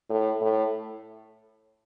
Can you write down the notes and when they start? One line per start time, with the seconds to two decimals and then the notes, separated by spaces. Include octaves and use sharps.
0.10 A2
0.41 A2